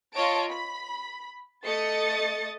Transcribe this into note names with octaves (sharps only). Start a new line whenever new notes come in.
F4 C#5 D#5 A5 D7
B5
A3 D#5 D#6 A6 C#7